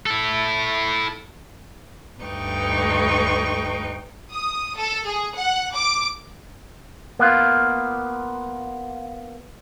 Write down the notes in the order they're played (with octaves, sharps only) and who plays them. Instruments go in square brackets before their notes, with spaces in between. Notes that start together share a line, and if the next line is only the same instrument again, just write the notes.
[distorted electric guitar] E4 A4
[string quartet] D2 G2 D#4 B4 G5 C#6
[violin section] D#6
A4
G#4
F#5
D6
[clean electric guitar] A#3 B3 F4